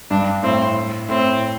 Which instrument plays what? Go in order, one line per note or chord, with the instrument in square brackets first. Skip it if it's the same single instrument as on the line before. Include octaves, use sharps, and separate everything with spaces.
[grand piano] G2 [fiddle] D4
[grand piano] A2 [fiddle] C4
[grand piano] A2 [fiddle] C4